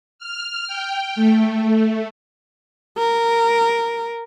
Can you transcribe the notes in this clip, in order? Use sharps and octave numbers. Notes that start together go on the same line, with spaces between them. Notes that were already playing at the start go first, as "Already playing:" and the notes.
F6
G5
A3
A#4